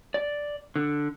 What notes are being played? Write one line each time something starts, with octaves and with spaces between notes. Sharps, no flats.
D5
D3